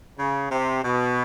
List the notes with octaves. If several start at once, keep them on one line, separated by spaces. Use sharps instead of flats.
C#3
C3
B2